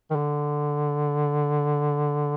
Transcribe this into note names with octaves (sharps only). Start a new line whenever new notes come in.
D#3
D3